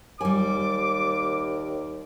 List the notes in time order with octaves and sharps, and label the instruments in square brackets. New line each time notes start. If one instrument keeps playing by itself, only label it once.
[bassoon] D#2 [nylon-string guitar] G3 G#5 [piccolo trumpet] D6